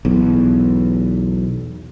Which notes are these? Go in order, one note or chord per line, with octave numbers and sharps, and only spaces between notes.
B1 E2